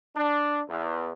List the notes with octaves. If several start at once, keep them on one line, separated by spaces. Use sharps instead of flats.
D4
E2